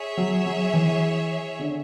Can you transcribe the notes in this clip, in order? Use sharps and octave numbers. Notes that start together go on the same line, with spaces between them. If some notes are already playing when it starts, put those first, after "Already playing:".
Already playing: G#4 C#5 E5
F#3
F#3
E3
D3